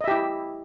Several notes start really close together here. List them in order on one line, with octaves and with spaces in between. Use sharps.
D#5 E5 G4 E4